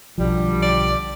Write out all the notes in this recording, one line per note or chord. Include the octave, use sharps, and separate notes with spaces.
B1 D3 F3 G3
D5